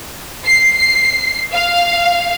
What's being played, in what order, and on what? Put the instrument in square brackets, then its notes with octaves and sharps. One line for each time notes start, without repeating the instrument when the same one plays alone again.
[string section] C7
F5